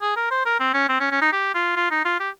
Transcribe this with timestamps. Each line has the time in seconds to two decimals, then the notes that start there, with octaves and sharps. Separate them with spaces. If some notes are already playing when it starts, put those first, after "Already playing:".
0.02 G#4
0.17 A#4
0.31 C5
0.46 A#4
0.60 C4
0.74 C#4
0.89 C4
1.00 C#4
1.11 C#4
1.21 D#4
1.33 G4
1.55 F4
1.77 F4
1.91 D#4
2.05 F4
2.20 G4